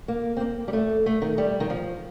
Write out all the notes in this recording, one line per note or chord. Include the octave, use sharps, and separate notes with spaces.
A#3
C4
A#3
G3
A3
A3
D#3
G3
D#3
F3